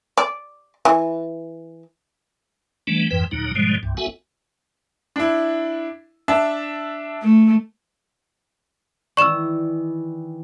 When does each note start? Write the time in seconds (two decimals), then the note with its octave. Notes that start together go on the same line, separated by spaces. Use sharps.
0.17 D5
0.85 E3
2.87 E3 G3 A3 B3 D4
3.10 F2 G#2 E3 B4 G5
3.31 D#2 A#2 D3 F#3 D#4
3.55 G#2 B2 D3 F3 G3 G#3
3.83 C2 G2
3.97 F#1 B3 F#4 A4 E5 G#5
5.16 D4 E4
6.28 D4 E5 A5
7.22 A3
9.17 D#3 E3 D5 C#6 E6 E7